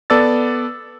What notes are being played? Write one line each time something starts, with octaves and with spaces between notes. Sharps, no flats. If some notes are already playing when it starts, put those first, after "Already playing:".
B3 A4 D5 E6 A6